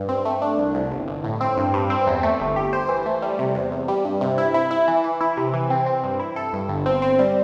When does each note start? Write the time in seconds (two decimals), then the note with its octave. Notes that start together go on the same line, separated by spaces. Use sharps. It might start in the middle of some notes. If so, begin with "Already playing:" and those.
Already playing: G2
0.09 C4
0.25 A3
0.42 D4
0.58 C2
0.75 C2
0.91 G1
1.08 G1
1.24 A2
1.41 C4
1.57 G2
1.74 G2
1.90 C4
2.07 E2
2.23 A3
2.40 G1
2.56 G4
2.73 C5
2.89 E3
3.06 A3
3.22 G3
3.39 C3
3.55 E2
3.72 E2
3.88 G3
4.05 G2
4.21 C3
4.38 E4
4.54 E4
4.71 E4
4.88 E3
5.04 E3
5.21 E4
5.37 C3
5.54 E3
5.70 C4
5.86 C4
6.04 G2
6.19 E4
6.36 A4
6.53 G2
6.69 G1
6.86 C4
7.02 C4
7.19 G3